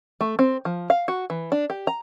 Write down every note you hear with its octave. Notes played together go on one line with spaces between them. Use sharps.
A3
C4
F3
F5
F#4
E3
D4
G4
A#5